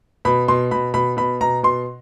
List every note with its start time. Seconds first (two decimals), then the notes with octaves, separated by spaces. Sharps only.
0.25 B2 B5
0.48 B2 C6
0.71 B2 B5
0.94 B2 B5
1.17 B2 B5
1.41 B2 A#5
1.63 B2 C6